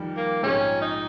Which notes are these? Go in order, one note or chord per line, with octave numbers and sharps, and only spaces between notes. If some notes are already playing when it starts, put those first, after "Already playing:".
Already playing: F2 D#3 G3
A#3
A#1 G#2 F3 C4 C#4 G4
D#4